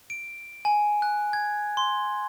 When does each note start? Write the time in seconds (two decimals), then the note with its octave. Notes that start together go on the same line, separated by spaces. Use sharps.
0.10 D7
0.65 G#5
1.02 F#6
1.33 G#6
1.77 C6